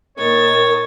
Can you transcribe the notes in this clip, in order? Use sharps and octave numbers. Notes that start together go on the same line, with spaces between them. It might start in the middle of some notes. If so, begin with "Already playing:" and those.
A#2 D#3 C#5 A6